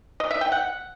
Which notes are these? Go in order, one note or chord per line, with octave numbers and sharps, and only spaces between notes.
D#5
E5
G5
F#5